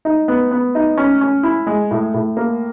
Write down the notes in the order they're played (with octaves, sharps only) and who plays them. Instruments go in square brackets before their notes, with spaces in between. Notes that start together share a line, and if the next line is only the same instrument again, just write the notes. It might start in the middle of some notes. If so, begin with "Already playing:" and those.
[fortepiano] D#4
B3
B3
D#4
C#4
C#4
E4
G#3
A2
A2
A#3